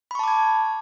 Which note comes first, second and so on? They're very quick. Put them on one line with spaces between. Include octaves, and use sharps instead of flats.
B5 C#6 A5 D6 G#6